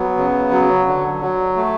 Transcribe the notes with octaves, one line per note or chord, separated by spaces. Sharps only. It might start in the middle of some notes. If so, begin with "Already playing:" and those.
Already playing: F#3 B3
C#3
F#3
D3
F#3
A3